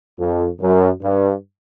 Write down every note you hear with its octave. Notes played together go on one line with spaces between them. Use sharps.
F2
F#2
G2